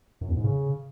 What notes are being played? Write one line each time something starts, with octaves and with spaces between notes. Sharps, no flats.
F#2
E2
G#2
C#3